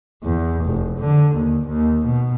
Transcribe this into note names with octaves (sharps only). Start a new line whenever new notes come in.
E2
F1
D3
D#2
D#2
B2